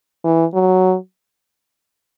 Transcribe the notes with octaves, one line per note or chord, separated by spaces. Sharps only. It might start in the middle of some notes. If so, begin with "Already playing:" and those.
E3
F#3